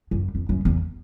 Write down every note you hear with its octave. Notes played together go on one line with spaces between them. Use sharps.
F#2
F2
F#2
E2